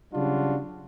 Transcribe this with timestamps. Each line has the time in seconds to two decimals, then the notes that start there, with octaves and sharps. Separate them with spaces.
0.13 C#3 F#3 G3 D4 F4 F#4